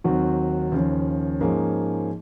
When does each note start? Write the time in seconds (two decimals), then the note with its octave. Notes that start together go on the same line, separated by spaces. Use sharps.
0.04 D#2 D#3 F#3 C4 F#4
0.72 D#2 C#3 F3
1.40 G#2 F3 A#3 C#4 G#4